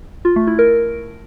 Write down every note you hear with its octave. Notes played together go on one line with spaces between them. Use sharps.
F4
A3
E4
A#4